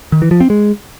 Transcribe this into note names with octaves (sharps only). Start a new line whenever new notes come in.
D#3
E3
F3
C4
G#3